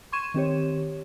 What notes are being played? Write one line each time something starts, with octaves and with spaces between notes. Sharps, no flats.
C6 C#6 G#6 D#7 E7
D#3 C4 G4 C#5